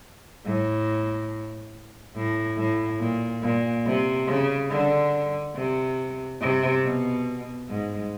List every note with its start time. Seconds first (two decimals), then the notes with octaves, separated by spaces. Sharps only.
0.45 A2
2.15 A2
2.58 A2
3.00 A#2
3.42 A#2
3.85 C3
4.27 C#3
4.71 D3
5.55 C3
6.40 C3
6.83 B2
7.69 G#2